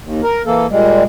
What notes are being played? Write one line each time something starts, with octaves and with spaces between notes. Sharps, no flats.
D#2
A#4
E3 A#3 A4
A#2 G3 G#3